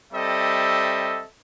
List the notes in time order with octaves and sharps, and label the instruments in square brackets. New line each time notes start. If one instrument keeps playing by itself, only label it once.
[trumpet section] G3 C4 A4 D#5 E5